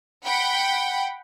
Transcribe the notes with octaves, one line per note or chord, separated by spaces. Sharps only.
F#5 G5 B5